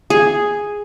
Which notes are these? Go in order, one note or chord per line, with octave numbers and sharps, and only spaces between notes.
G#4